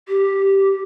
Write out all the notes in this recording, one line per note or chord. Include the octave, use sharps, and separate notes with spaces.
G4